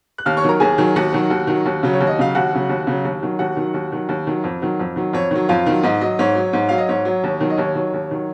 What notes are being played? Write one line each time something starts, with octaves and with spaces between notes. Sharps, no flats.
F#6
D#2 F5 F6
C#5 C#6
D#3 F#3 A#4 A#5
D#2 G#4 G#5
D#3 F#3
D#2 F#4 F#5
D#3 F#3
D#2
D#3 F#3
D#2
C#3 F#3
C#5
D#2
D#5
C#3 F#3 F5
D#2 F#4 F#5
C#3 F#3
D#2
C#3 F#3
D#2
D#3 F#3
D#2 F#4 F#5
D#3 F#3
D#2
D#3 F#3
D#2
D#3 F#3
F2
D#3 F#3
F2
D#3 F#3
F2 C#5
D#3 F#3
F2 F4 F5
D#3 F#3
G#2 D#5
F#3 D#5
G#2 C#5
F#3
G#2
F#3 F5
D#5
G#2 C#5
F#3
D#2
D#3 F#3
D#5
D#2 C#5
D#3 F#3
D#2
D#3 F#3